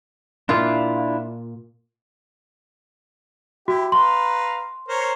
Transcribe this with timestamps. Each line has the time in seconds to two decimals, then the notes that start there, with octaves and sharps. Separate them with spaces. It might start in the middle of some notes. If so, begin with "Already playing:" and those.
0.49 A#2 D4 E4 F4 F5
3.68 E4 F#4 G4
3.92 B4 F5 A#5 C6
4.88 A#4 C5 C#5